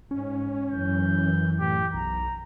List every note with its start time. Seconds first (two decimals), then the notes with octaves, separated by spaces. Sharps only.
0.11 G#2 C#4
0.71 F#2 E3 G6
1.60 A2 G4
1.94 B1 A#5